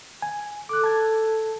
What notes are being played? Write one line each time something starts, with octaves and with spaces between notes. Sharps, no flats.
G#5
A4 D6 F#6
A5 G#6